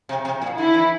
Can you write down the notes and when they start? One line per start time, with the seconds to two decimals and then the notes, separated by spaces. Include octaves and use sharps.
0.09 C3
0.25 C3
0.42 A#2
0.58 D3 E4
0.74 E3